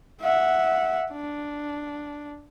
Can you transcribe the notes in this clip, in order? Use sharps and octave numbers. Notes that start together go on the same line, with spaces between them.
E5 F#5
D4